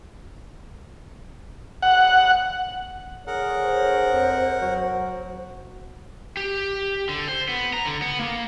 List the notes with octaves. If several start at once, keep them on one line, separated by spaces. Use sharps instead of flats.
F#5
D3 G#4 A#4 C#5 F#5
C5
F2
F#3 F#4
G4
D3
C5
B3
A#5
D3
B3
A#3